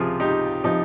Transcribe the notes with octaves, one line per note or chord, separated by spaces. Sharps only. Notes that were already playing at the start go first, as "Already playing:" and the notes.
Already playing: C#2 C3 F3 F4 G#4
D#4 G4
C3 F3 D#4 G4